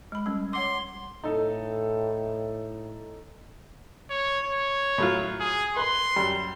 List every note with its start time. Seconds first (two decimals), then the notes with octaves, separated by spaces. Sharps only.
0.12 G#3 B5
0.26 G3 C#4
0.53 C#5 F#5 C6 D6
1.24 A2 D#4 A4
4.10 C#5
4.44 C#5
4.98 A2 F#3 F4
5.40 G#4
5.76 B4 B5 C6
6.16 F#2 G3